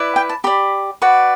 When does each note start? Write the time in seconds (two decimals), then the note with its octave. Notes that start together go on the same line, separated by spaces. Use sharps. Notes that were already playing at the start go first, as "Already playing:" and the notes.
Already playing: E4 B4 D5
0.16 G5
0.29 A5
0.44 G4 D5 B5
1.02 F#4 B4 D5